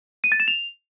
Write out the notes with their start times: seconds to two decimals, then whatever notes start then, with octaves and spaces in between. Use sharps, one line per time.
0.24 D#7
0.32 A6
0.40 E7
0.48 F7